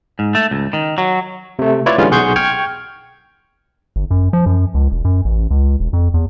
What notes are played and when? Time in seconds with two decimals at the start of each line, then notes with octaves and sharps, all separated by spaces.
0.19 G#2
0.35 A3
0.51 C#2
0.73 D#3
0.98 F#3
1.59 C3 A3
1.86 E4 F4 B4 C#5 D5
1.98 D3 E3 G3 G#3 C#4 F4
2.11 B1 G#4 F#5 C6 C#6 G6
2.36 G5 C#6 F6 G#6
3.96 G1
4.11 F#2
4.33 F3
4.46 F#2
4.75 C#2
4.92 E1
5.05 F#2
5.25 A1
5.51 C#2
5.80 E1
5.93 F2
6.14 E2